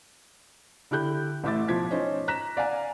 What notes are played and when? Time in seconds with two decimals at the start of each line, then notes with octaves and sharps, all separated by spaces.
0.91 D3 E4 G4 F#6 G6
1.44 A1 A2 E5 D6 A6
1.68 B1 F3 G#6 B6
1.91 C#4 D#4 C5
2.28 A#5 F#6 A#6 B6 E7
2.57 D5 F5 F#5 G#5 A#5